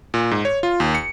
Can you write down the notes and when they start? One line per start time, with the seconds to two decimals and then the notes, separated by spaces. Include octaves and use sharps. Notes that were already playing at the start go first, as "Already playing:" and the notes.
0.14 A#2
0.31 G#2
0.45 C#5
0.63 F4
0.80 D#2
0.95 C#7